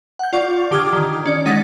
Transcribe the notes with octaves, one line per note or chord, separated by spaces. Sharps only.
F#5 G6
F4 D5 C#6
D3 G4 D6 D#6 F6 G#6
D#3
C#4 D5
G#3 D#4 F#5 D#6 A6 B6